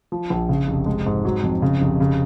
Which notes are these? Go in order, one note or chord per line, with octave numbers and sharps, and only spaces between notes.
F3
A#1
C#3
F1
G#3
G#2
F#3
F2
C#3
F1
C#3